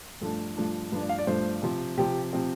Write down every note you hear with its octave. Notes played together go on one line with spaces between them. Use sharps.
G2 F3 A3 D4 A4
G2 F3 A3 D4
G2 F3 A3 D4 B4
D5
F5
D5
G2 F3 A3 D4 C5
C3 F3 C4
C3 F3 C4 G4
C3 F3 C4